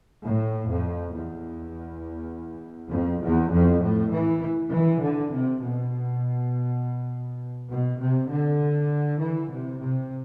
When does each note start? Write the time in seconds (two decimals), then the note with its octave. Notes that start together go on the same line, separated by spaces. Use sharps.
0.22 A2
0.68 F2
1.13 E2
2.91 F2
3.22 E2
3.52 F2
3.82 A2
4.12 E3
4.71 E3
5.02 D3
5.31 C3
5.62 B2
7.71 B2
8.01 C3
8.30 D3
9.21 E3
9.50 C3
9.80 C3